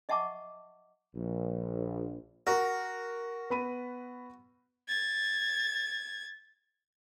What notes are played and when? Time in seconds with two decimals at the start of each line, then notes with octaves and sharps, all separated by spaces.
0.09 D#5 E5 F#5 A5 C#6 D6
1.16 A#1
2.47 F#4 A#4
3.50 B3 B5 D#7
4.88 G#6 A6